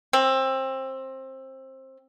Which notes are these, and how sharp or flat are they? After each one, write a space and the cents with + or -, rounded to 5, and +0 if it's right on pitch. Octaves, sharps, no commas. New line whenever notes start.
C4 +20